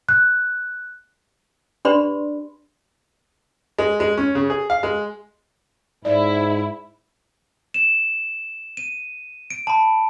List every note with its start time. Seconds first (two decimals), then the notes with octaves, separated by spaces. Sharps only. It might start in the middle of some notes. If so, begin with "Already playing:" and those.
0.09 F#6
1.85 D4 G4 B4 D5 B5 C6
3.79 G#3
4.00 G#3
4.18 C#4
4.35 C#3
4.50 G#4
4.70 F5
4.83 G#3
6.05 G#2 E4 D5
7.74 E7
8.77 D#7
9.50 D7
9.67 A5 B5